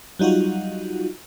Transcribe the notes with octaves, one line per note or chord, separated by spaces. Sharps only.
F#3 G3 D#4 F4 F#4